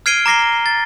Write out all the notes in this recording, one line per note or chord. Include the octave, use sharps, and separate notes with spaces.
F6 G#6 C7 D7 D#7 G7
A#5 D6 A#6 C7 G7
A6